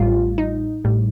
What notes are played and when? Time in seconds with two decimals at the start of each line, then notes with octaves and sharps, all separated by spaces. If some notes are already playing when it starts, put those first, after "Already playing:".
Already playing: A1 A2 G3 F4
0.38 D#4
0.84 A1 A2 G3